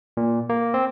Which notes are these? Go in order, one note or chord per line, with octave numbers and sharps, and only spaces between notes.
A#2
A#3
C4